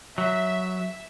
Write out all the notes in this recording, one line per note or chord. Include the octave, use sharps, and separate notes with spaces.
F#3 E5